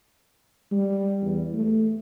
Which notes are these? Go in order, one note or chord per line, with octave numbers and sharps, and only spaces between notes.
G3
E2
A3